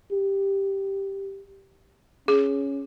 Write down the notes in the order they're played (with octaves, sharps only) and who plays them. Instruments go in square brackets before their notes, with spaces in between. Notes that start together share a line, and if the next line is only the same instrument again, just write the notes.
[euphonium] G4
[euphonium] C#4 [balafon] G#4